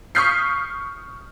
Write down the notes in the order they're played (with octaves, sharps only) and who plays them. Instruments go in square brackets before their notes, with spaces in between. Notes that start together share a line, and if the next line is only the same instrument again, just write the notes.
[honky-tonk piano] C#6 D#6 F6 G6 B6 C7